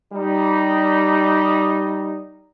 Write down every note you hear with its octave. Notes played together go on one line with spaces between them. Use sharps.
G3 D#4